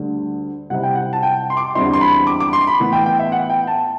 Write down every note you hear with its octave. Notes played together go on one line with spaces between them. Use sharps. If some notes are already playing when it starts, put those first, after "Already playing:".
Already playing: D2 D3 G3
C3 G3 C4 E4 F#5
G5
F#5
A5
G5
C6
D6
E2 D3 G3 C4 E4 C6
C6
B5
D6
D6
C6
B5
A2 E3 B3
G5
G5
E5
F#5
G5
A5